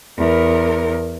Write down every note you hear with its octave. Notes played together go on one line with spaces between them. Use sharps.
E2 A#4